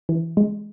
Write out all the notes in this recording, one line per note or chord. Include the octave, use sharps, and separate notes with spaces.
E3
G#3